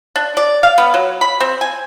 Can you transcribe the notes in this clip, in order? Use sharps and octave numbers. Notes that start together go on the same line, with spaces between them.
D4
D5
F5
B3
F#3
B5
C4
G#5